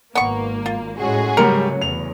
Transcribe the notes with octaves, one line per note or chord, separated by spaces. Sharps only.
G#1 A#3 B3 C#6
F4
A2 G#3 C#4 F#4 G#4
G#2 C#3 F#3 G3 A3 A#4 C#7
E2 F7